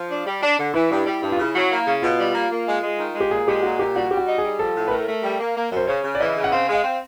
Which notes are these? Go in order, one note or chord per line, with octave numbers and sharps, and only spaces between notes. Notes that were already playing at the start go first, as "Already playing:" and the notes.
Already playing: F3
D4
G3
D4
D3
E3 E4
G2
G3
G2
F4
C#3 E4
F#3
A#3
C#3
B2 F4
G3
A#3
A#3
G#3
G#3
D#3
G#3
G4
A#2 G#4
G#3 G4
A#2 F#4
A#2 G4
G3 F#4
G3 G4
F#4
D#4
G#4
G3
F3 A4
A2
B4
A3 A#4
A3
G3
A#3
A#3
F#2
C5
C#3 C#5
C#3
D5
E3 D#5
C#3
F#5
C4 F5
G#3 F5
C4